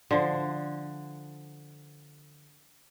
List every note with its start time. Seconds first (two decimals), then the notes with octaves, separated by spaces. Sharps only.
0.11 D3 F3